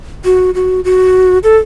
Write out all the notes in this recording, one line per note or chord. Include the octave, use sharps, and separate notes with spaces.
F#4
F#4
F#4
A4